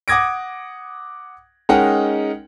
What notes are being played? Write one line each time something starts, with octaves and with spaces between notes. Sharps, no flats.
F#5 D6 D#6 G#6 A#6 D7
G#3 C#4 D#4 A#4 F#5 G5